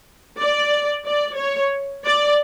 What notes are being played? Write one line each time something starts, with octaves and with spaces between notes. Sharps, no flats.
D5
D5
C#5
D5